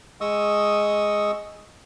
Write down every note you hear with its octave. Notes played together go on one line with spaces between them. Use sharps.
G#3 D#5 C#6 D#6 E6